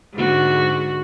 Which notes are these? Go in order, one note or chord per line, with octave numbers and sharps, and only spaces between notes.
G#2 D3 F#4